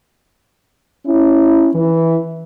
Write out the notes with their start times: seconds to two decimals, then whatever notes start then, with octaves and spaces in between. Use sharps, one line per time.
1.05 C#4 E4
1.74 E3